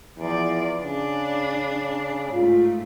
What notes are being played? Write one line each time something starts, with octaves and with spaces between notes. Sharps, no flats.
E2 F3 D5
C#3 D4
G#2 A3 F4